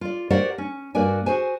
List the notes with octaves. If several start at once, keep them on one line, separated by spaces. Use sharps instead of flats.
F4 D5
F#4 G4 A#4 C5 D5 F#5
C#4
G2 A#3 F#4 D5 G#5
F#4 G#4 C5 G#5